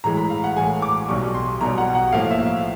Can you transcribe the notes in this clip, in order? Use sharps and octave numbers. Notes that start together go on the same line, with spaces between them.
A2 E3 G#3 A#5
B5
F5
F#5
A2 E3 G#3 G#5
D6
B1 B2 G3 C#6
C6
B1 B2 G3 A#5
F#5
F#5
A2 F3 A#3 F5
E5
F5